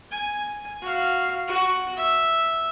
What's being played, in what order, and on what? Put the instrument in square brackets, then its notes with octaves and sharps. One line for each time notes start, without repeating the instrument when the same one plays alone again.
[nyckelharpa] G#5
F#4 F5
F#4
E5